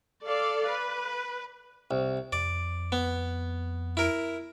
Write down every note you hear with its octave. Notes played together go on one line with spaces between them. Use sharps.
A4 D5 F5
B4
C2
F2 D5
B3
E4 A#4